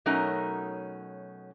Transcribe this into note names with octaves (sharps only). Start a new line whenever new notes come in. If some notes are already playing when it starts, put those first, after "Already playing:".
B2 F#3 A3 C#4 D#4 A#4